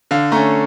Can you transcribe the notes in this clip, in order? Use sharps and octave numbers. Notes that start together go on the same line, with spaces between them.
D3 F5
A3 C#4 A#5